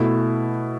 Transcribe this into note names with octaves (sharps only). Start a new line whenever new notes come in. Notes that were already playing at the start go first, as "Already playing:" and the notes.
Already playing: B2 A3 E4